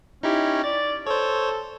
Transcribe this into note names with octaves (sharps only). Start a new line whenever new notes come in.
C#4 D#4 E4 G4
D5 A6
A4 C5 C#5